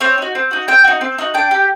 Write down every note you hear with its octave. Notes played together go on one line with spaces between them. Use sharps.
C4 C#5
D#4 F#4
C4
D#4 F#4
C4 G5
D#4 F#4
C4
D#4 F#4
D4 G5
G4